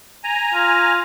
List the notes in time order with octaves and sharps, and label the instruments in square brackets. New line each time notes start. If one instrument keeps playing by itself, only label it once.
[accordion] G#5 A#5
[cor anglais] F4